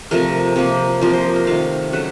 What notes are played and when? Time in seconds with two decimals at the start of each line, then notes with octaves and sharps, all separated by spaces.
0.11 C3 F3 A3 A#4
0.56 C3 F3 A#3
1.01 C3 F3 A#3 A#4
1.13 C5
1.36 A#4
1.47 D#3 A3 F5
1.92 C#3 F#3 A3 F#5